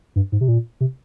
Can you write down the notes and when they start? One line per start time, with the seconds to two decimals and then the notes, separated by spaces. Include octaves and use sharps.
0.16 G2
0.32 G#2
0.41 C3
0.48 A#2
0.81 C3